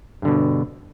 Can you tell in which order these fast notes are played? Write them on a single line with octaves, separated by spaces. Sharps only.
G2 D3 B2